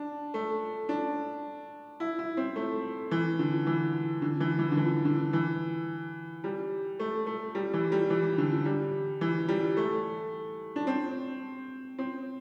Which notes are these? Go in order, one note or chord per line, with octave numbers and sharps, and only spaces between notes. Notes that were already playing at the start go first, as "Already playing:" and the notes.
Already playing: D4
A3
D4
E4
E4
C4
A3
E3
D3
E3
D3
E3
E3
D3
E3
D3
E3
G3
A3
A3
G3
E3
G3
E3
D3
G3
E3
G3
A3
D4
C4
C4